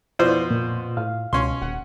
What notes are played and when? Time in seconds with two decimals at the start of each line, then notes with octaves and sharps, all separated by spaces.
0.19 F2 B2 E4 F4 C5 D5
0.51 A#2
0.97 A2 F5
1.33 C#2 B2 C#4 C6
1.62 D#1 F#5